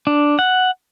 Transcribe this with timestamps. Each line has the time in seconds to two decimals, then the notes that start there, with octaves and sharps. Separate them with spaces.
0.07 D4
0.39 F#5